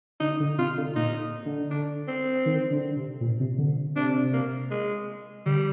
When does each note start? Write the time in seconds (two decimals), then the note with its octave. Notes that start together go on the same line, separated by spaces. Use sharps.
0.20 D3 D#4
0.40 D3
0.58 C3 F4
0.77 D3
0.96 A#2 D#4
1.46 D3
1.71 D4
2.08 C4
2.46 D#3
2.71 D3
2.96 C3
3.20 A#2
3.40 C3
3.58 D3
3.95 C3 D4
4.33 A#3
4.71 G#3
5.46 D3 G3